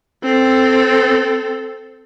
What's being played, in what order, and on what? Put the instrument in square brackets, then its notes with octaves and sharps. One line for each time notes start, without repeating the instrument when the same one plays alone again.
[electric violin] C4 A4